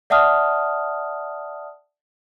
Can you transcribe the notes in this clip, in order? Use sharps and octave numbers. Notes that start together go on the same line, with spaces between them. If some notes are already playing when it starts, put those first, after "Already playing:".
D5 E5 F#5 A5 D#6 F6